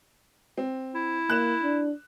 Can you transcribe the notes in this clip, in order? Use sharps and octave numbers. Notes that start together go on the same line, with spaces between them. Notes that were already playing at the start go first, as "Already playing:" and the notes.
C4
E4
A#3 F#6 E7
D4